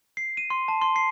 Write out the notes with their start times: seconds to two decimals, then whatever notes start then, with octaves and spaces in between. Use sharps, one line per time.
0.17 C7
0.37 D#7
0.50 C6
0.68 A5
0.81 C6
0.96 C7